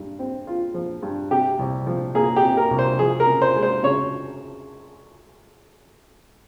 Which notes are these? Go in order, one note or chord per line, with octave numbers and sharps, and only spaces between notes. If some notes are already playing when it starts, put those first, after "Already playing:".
Already playing: G2
C4
F4
F3
G2
C3 G4
C2
F3
A#3 G#4
G4
C3
A#4
C2
C5
F3 G#4
A#4
C#3
C5
G#3
C5
C#3 C#5